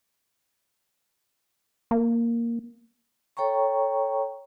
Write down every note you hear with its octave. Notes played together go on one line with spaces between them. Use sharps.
A#3
A4 C#5 G5 A#5 C#6